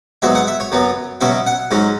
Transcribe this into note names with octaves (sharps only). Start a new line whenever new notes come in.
G#2 F#3 B3 E5
F#5
E5
C#5
F#2 F#3 B3
B2 F#3 C#4 E5
F#5
G#2 F#3 C#4